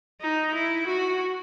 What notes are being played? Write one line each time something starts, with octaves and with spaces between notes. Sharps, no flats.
D#4
E4
F#4